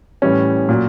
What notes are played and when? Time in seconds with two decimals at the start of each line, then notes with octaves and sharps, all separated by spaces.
0.22 A2 E3 G3 C#4
0.69 A#2 F#3